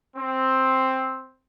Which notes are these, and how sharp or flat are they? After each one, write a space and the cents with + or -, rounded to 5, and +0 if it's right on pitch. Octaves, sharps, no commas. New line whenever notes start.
C4 +5